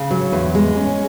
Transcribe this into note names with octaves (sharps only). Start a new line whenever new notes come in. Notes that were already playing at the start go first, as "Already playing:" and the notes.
Already playing: C#3
F#3
E2
G#3
C#4